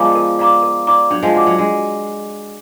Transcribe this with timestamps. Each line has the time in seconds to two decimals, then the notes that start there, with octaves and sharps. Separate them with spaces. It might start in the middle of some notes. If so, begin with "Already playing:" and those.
Already playing: F3 G#3 B3 A#4 D5 F5 A#5 D6
0.15 A#4
0.39 D5 F5 A#5 D6
0.63 A#4
0.87 D5 F5 A#5 D6
1.10 F#3 D4
1.22 F3 G#3
1.35 F#4 D5 F#5 D6
1.47 F#3
1.58 G#3 D4